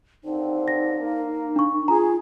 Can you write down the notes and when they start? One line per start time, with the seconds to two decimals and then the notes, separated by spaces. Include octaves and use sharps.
0.24 D#2 D3 C4 D#4
0.68 A#6
0.98 A#3
1.56 D4 C#6
1.88 F4 G#4 A#5